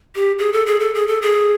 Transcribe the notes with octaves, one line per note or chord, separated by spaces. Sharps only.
G4
G#4
A4
G#4
A4
G#4
A4
G#4